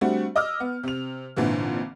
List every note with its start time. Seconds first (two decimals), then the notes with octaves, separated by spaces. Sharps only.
0.01 G3 A3 C4 D4 F#4
0.36 D#5 D6 E6 F6
0.60 B3
0.83 C3 F7
1.36 G#1 A#2 D3 E3